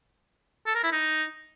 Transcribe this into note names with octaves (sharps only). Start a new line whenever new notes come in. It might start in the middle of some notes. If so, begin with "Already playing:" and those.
A4
A#4
E4
D#4